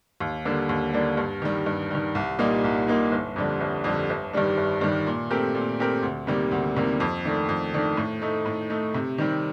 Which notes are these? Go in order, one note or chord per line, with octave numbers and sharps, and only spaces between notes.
D#2
D3 G3 A#3 D4
D#2
D3 G3 A#3 D4
G2
D#3 G3
G2
D#3 G3
C2
A#2 G3 A#3 D#4
C2
A#2 G3 A#3 D#4
G1
F2 D3 G3
G1
F2 D3 G3
G1
G2 D#3 G3 D4
G1
G2 D#3 G3 D4
A#2
A3 C4 G4 A#4
A#2
A3 C4 G4 A#4
D2
C3 D#3 G3 A#3
D2
C3 D#3 G3 A#3
F2
D#3 A3 D4
F2
D#3 A3 D4
A2
A3 D#4
A2
A3 D#4
C3
D#3 G3 C4